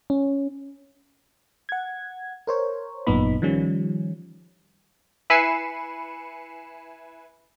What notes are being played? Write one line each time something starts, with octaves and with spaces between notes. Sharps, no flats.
C#4
F#5 G#6
A#4 C5 C#5
G#1 F#2 A#2 B3 D#4 B5
D#3 F3 G3 C#4
E4 B4 G#5 C7 C#7 E7